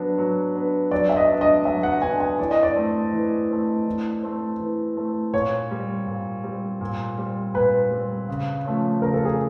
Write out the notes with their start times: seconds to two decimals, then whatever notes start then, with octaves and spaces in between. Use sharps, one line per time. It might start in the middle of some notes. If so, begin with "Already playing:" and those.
Already playing: F#3 B3 D4
0.18 F#3
0.54 B3 D4
0.91 F#3 D5
1.09 E5
1.17 D#5
1.29 B3 D4
1.41 D#5
1.65 F#3 E5
1.83 F#5
2.02 B3 D4 G#5
2.20 G#5
2.39 E3 D5
2.51 D#5
2.63 D5
2.76 A3 C4
3.13 E3
3.50 A3 C4
3.87 E3
4.23 A3 C4
4.60 E3
4.97 A3 C4
5.33 A#2 C#5
5.71 G3 C4
6.07 A#2
6.44 G3 C4
6.81 A#2
7.18 G3 C4
7.54 A#2 B4
7.91 G3 C4
8.28 C#3
8.65 F3 A3 C#4
9.02 C#3 A#4
9.14 A4
9.25 G#4